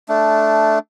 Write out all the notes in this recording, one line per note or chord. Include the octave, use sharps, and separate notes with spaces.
A3 D4